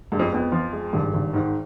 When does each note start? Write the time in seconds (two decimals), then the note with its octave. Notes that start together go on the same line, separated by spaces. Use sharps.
0.12 G2 G#3
0.19 F2
0.32 F2 B3
0.52 F3
0.73 G#3
0.93 G#1 G2
1.13 G#1
1.33 G#2 D#3